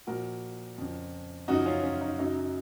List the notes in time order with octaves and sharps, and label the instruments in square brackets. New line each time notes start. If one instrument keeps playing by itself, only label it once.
[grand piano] A#2 F3 F#4 A#4
F2 C#3 F3
F#2 C#3 F3 D#4 F#4
C#4 F4
C#4
D#4
F#2 C#3 F#3 D#4
D#4